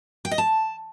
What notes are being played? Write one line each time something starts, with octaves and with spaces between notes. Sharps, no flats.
G5
D#5
A5